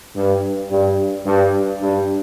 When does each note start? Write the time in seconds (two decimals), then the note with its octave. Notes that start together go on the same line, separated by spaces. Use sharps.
0.16 G2
0.71 G2
1.26 G2
1.81 G2